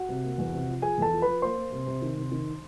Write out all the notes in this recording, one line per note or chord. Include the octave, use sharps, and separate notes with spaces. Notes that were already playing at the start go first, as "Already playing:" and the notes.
Already playing: F#4 F#5
C3
A#3
E2
C3
F3
F3 G#4 G#5
E2 A4 A5
F3
F3 B4 B5
A#3 C5 C6
A#3
C3
C3
D#3
C3
D#3